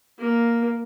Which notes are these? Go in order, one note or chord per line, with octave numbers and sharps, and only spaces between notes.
A#3